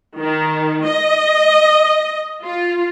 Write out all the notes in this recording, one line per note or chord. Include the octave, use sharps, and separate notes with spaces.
D#3
D#5
F4